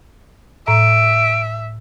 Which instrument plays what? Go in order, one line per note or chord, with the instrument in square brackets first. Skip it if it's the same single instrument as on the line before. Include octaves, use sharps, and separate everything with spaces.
[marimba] A2 A#5 [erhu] E5 [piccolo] D7